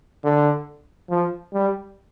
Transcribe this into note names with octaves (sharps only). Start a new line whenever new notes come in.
D3
F3
G3